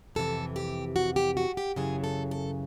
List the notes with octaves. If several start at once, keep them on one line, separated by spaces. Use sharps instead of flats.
F2 C3 E3 A4
G4
F#4
G4
F#4
G4
F#2 C#3 E3 G#4
A4
A4